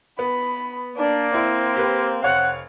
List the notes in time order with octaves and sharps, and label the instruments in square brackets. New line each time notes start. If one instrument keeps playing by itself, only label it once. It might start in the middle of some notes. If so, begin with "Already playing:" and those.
[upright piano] B3 [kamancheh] B5
[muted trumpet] A#3 [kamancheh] D4 D5
[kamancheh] C4 [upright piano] E4
[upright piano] G4 B4
[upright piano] F1 C#5 F5 [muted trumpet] F#5